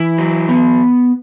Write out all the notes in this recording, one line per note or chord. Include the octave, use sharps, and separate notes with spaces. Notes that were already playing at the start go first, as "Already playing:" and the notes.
Already playing: E3 E4
F#3
B3